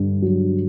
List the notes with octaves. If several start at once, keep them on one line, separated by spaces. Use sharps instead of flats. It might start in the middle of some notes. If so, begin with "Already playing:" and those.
Already playing: G2 D3
F#3